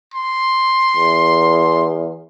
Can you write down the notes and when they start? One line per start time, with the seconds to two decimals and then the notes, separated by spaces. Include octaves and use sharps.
0.14 C6
0.96 E2